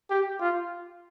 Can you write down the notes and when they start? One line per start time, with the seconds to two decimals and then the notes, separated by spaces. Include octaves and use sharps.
0.10 G4
0.40 F4